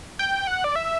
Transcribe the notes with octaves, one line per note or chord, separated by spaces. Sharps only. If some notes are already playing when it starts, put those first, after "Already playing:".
G5
F#5
D5
E5